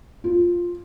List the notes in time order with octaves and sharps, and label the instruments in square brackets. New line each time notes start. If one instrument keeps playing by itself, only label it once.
[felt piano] F4